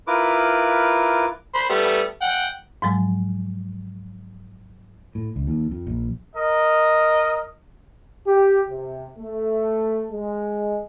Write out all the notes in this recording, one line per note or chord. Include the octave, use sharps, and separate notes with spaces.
E4 F4 A#4 B4 D6
C5 B5 C6
G3 A3 B3
F#5 G5
G#2 F3 F#3 G#3
A2
C#2
D#2
F2
A#1
A#4 D#5
G4
C3
A3
G#3